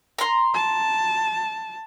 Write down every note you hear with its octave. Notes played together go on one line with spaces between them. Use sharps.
A#5 C6
A5